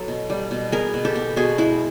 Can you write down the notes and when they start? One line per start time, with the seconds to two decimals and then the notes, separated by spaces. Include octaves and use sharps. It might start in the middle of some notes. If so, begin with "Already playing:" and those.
Already playing: F#3 B3 A4
0.08 B2
0.30 G3
0.51 B2
0.72 B3 G#4 A#4
0.94 B2
1.05 G4 A4
1.15 B3
1.36 B2 F#4 G#4
1.58 G#3 E4 F#4